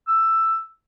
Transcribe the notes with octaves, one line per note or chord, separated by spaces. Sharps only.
E6